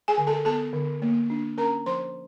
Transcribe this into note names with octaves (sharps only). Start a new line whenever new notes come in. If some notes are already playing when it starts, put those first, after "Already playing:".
G#4 G#5
D3
A4 A5
B3 A4 A5
D3
A#3
D4
C#4 A#4 A#5
F3 C5 C6